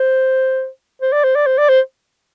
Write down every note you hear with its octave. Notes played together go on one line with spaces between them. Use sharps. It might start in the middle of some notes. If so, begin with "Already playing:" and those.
Already playing: C5
C5
D5
C5
D5
C5
D5
C5